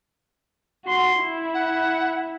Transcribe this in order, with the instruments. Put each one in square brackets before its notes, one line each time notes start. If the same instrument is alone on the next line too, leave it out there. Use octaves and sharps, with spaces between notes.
[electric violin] F#4 C6
E4
[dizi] F#5